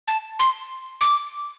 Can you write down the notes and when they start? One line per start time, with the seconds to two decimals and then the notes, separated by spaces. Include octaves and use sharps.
0.08 A5
0.39 C6
1.01 D6